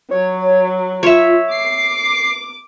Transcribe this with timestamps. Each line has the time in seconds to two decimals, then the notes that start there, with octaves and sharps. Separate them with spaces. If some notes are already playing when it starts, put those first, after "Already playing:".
0.11 F#3 C#5
1.03 F4 C#5 E5
1.51 D6 C7